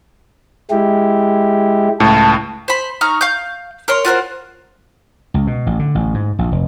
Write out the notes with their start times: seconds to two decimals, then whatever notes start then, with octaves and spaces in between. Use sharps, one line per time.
0.71 G#3 E4 G4
2.00 C#2 A2 A5
2.68 C5 B5
3.01 D#4 A#5 C#6 F6
3.21 F5 G6
3.88 A#4 C#5 C6
4.05 F4 F#4 A#4 C5
5.34 C#2
5.47 B2
5.66 A1
5.79 D3
5.95 A1
6.14 G#2
6.39 A#1
6.52 F1